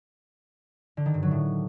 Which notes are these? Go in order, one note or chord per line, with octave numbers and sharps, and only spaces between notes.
D3
D#3
G2
F#3
A2